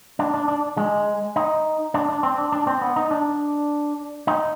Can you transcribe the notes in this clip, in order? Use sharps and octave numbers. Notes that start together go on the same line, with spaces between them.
D4
D4
D4
G#3
D#4
D4
D4
C4
D4
D4
C4
B3
D#4
D4
D#4